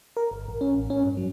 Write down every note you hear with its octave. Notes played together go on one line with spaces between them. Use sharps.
A#4
G1
A1
C#4
A1
C#4
G2
F#3